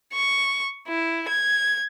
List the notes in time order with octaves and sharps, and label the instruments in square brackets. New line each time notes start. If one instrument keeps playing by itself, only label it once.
[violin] C#6
E4
G#6